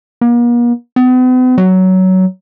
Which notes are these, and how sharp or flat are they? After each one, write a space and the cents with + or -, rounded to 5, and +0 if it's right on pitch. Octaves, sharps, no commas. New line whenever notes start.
A#3 +45
B3 +45
F#3 +15